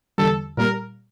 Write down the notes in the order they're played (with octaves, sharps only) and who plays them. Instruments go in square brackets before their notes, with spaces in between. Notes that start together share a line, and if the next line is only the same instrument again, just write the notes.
[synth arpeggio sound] E2 D3 G3 [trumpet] A4
[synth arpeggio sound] A#2 G3 A#3 [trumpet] A#4